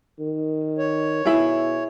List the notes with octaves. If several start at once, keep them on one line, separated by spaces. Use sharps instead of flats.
D#3
C#5
B2 E4 G#4